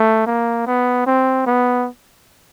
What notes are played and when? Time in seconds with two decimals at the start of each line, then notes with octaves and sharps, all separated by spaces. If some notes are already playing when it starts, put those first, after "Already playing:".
Already playing: A3
0.27 A#3
0.66 B3
1.06 C4
1.46 B3